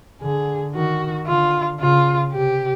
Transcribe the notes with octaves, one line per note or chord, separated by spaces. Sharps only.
D3 G#4
D#3 F#4
D3 F4
C#3 F4
C3 G4